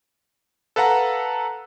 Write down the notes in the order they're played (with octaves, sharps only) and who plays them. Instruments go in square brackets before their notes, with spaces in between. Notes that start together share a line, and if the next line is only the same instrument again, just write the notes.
[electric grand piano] A4 B4 F5 F#5 A#5